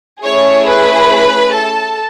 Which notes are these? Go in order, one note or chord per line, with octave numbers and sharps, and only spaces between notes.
A3 C#4 E4 G#4 C#5
B4 B5
A4 A5